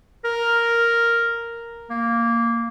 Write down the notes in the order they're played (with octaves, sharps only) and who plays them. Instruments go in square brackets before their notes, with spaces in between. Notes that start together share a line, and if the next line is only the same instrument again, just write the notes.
[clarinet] A#4
A#3